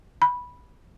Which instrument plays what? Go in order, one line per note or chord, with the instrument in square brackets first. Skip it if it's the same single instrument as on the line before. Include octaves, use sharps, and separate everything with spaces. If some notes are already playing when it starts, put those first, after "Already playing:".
[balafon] B5